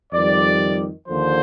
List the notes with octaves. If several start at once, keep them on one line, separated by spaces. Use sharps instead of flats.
F2 D#3 G3 D5
D#2 D3 F3 C5